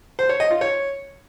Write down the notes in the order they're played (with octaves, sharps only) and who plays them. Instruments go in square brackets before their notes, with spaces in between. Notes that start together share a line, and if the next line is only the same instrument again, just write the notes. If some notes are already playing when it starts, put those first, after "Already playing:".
[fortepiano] C5
C#5
D#5
F4
C#5